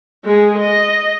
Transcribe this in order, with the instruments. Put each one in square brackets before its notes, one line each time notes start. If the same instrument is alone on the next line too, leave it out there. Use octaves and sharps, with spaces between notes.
[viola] G#3 G#4
D#5